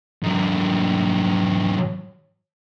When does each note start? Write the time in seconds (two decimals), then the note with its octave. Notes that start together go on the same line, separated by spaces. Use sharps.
0.23 G#2 F#3